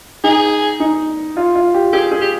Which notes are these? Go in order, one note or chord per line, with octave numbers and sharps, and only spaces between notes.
D#4 G#4
D#4
F4
F4
G4
G4 G#4
G#4
G4